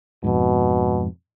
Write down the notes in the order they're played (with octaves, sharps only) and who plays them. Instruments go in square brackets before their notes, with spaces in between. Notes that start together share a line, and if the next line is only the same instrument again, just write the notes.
[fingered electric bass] F2 G#2 [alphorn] B2